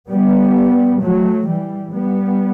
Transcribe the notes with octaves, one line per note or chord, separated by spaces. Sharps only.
G3 B3
F#3 A3
E3 G3
G3 B3